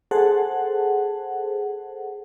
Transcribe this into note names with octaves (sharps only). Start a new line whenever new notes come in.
G#4 A4 C5 F#5 A5